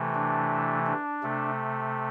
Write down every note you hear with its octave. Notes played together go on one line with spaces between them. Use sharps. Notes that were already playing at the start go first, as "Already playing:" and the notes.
Already playing: C3 E3 A3
D4
D4
C3 A3